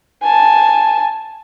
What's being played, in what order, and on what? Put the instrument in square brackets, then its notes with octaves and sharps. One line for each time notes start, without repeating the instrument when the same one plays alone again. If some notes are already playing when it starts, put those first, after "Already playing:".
[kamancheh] G#5 A5